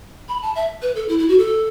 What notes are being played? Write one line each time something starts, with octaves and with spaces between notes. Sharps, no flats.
B5
A5
E5
B4
A4
E4
E4
F#4
A4